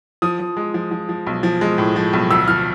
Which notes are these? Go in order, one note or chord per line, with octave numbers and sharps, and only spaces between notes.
F3 D#6
F3
G#3
F3
F3
F3
B1
F3
G#3
A2
F3
B1
D2 E6
F3 F6